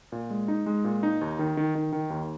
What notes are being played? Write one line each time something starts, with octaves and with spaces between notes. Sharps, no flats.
A#2
G#3
D#4
G#3
A#2
D#4
D#2
D#3
D#3
D#3
D#3
D#2